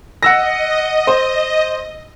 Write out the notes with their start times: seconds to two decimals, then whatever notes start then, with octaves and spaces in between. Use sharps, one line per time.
0.23 D#5 F#5 E6 A#6
1.07 C5